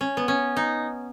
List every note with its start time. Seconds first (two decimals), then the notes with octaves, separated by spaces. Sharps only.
0.01 C#4
0.17 B3
0.28 C#4
0.56 D#4